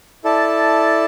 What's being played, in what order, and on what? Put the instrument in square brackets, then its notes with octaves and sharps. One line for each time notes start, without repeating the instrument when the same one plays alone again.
[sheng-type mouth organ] E4 A4 D5 A5